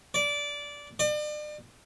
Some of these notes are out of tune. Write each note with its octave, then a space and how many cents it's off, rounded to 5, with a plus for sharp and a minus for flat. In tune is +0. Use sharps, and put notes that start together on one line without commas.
D5 -15
D5 +40